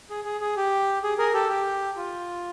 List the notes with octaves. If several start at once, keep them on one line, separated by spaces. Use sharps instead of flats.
G#4
G#4
G#4
G4
G#4
G#4 A#4
G4 A4
G4
F4